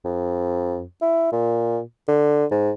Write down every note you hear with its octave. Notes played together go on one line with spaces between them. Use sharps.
F2
E4
A#2
D3
G#2